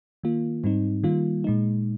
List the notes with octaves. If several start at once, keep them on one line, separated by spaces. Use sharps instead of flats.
D#3 A#3 F4
G#2 G3 C4 D#4
D#3 G3 A#3 F4
A#2 G#3 D#4